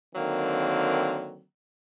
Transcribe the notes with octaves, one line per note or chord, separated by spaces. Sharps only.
D3 D#3 F#3 A#3 C4